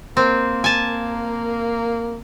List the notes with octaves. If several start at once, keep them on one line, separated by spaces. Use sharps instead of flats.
A#3 C4
G#5 A5